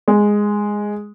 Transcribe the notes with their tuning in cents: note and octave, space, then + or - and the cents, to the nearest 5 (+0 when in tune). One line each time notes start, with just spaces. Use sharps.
G#3 -5